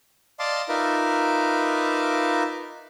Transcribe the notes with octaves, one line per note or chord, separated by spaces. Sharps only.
D5 D#5 F5 A5 C6 D6
D#4 F4 A#4 B4 E5 D6